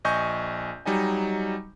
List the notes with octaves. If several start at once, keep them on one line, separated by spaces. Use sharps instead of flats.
A#1 D#5 G#5 C#6 G6
F#3 G3 D#4 D#5 G#5